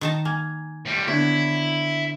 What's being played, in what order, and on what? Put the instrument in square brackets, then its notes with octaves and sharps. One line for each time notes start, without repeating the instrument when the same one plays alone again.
[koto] D#3 D#4 A5
[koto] A#3 [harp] G#5
[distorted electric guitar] A2 G3
[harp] D3 B3 C#5 [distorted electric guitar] E4